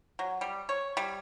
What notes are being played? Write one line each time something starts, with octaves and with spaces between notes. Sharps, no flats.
F#3
G3
C#5
G3